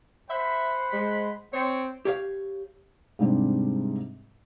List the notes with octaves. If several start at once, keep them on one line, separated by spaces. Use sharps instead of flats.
C5 E5 F#5 B5
G#3
C4 C#5
G4 C#5 F5
G#2 C3 G3 C4 D4